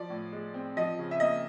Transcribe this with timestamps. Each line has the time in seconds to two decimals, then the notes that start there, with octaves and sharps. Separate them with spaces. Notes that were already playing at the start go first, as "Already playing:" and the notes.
Already playing: F3 D5
0.10 A2
0.32 G#3
0.54 C4
0.77 F3 D#5
0.99 C#3
1.11 E5
1.20 A#3 D#5